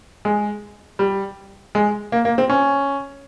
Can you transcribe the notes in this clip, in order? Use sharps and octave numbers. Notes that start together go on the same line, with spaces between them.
G#3
G3
G#3
A#3
A#3
C4
C#4